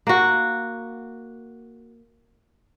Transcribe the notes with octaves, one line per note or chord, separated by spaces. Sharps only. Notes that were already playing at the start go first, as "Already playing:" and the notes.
A#3 F#4